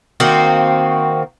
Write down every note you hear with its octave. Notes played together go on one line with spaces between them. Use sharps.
D#3 A#3 C4 F#4